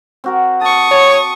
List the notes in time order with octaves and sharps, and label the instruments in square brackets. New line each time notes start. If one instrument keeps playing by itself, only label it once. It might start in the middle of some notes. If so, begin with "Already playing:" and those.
[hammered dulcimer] C4 F#4 A#4
[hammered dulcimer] A5 [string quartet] C#6 D#6
[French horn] C#5 [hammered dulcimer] A5